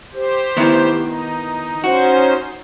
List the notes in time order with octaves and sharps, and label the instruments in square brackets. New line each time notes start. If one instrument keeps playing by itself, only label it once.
[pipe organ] G4 C5
[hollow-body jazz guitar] D#3 B3 E4
[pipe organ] D#4
[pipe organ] C#4 D#4 C5 [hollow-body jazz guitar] F#4